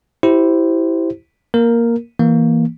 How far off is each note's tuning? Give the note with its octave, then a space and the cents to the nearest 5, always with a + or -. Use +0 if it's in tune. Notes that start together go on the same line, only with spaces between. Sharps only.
E4 +0 G4 -20 C5 +0
A#3 +5 A#4 +0
E3 +0 A#3 +0